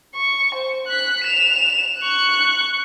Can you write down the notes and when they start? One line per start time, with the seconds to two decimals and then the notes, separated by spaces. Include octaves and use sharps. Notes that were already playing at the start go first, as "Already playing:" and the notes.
0.15 C#6
0.55 C5
0.87 F#6 B6
1.24 E7 F7
2.00 C#6 F#6